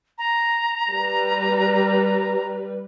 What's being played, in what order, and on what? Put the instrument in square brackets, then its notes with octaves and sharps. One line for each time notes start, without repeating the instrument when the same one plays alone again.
[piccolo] A#5
[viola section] G3 B4